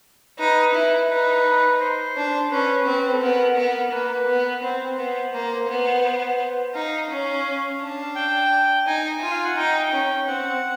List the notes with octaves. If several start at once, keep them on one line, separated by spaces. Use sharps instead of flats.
D#4 B4
E4
D#4 B4
C5
D4
C#4 B4
C4
A4
B3 A#4
B3
A#3 B4
B3
C4 C5
B3
A#3 C5
B3
C5
D#4 F5
C#4
D4
G5
D#4 G#5
F4
F5
F#5
D#4 G5
C#4
C4 F#5